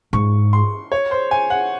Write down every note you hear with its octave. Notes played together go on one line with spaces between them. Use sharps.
G#2 C#6
C6
C#5
C5
G#5
F#5